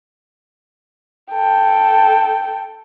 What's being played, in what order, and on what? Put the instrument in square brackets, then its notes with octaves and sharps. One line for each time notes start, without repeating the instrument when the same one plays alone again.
[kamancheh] A4 G5